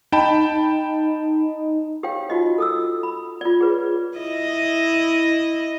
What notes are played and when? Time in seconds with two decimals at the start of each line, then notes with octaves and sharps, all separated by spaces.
0.12 D#4 G5 A5 B5
2.03 G4 C5 C#5 F5 G5
2.30 D#4 F4 F#4 D#5
2.58 A4 D#6 E6
3.03 B5
3.41 F4 D5
3.61 G#4 B4 C#5
4.18 E4 D#5